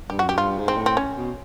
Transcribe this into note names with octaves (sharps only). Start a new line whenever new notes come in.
G2 G4
F#2 F#4
G4
G2 F4
G#2
C4
A2
C4
C#4
B2